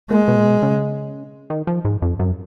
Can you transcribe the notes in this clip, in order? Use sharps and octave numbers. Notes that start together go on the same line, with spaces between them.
A#2 G#3
B2
A#2
B2
C#3
D#3
F3
G#2
F2
F#2